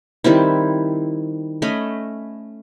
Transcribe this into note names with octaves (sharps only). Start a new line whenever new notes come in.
D#3 G3 C4 E4
A3 C#4 D#5 B5